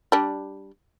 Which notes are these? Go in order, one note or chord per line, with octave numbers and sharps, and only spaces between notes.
G3 D4